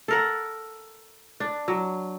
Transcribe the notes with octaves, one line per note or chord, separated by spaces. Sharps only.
A4 A#4 F#5
D4
F#3